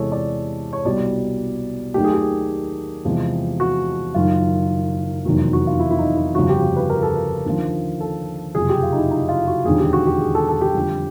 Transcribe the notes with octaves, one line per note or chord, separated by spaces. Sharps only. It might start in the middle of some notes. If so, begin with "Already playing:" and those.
Already playing: E2 C3 E3 G#3 A4 C#5
D5
C#5
C2 B2 G3 D5
D#2 D#3 F#3 A3 G4
G#4
G4
E2 C3 F3 G#3
F#4
F#1 F#2 D#3 F4
F1 E2 C3 D#3 F#3
F#4
F4
E4
E4
D#4
E4
G1 F2 C#3 F3 F#4
G4
F#4
B4
A#4
A4
A#4
D#2 D3 F3
A4
F#1 F2 C3 G#4
G4
F4
D#4
E4
D#4
F4
F#4
E1 D#2 D3 F3 G#4
G4
F#4
G4
G#4
A4
A4
G4
F2 D3 G3